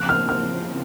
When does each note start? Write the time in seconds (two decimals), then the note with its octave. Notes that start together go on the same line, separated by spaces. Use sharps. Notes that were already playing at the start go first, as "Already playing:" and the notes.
Already playing: C#3 F3 C4 F#6
0.09 F6
0.29 F6